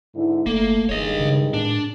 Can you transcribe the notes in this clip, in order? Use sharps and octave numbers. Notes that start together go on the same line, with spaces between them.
G#2 D3 E4
F#1 A3 A#3 A4
F1 G2 D#3 G#3 C#5 D#5
C#3
A2 D4